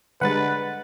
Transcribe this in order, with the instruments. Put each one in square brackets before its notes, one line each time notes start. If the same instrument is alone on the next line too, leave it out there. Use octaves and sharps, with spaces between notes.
[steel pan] D3 G3 G#3 [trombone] B4 [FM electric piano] F#5 A6